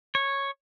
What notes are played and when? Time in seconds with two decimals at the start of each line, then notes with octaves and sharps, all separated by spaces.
0.15 C#5